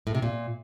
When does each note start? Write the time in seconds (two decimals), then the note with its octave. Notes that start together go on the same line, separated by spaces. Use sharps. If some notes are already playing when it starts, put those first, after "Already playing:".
0.07 A2
0.15 C3
0.22 A#2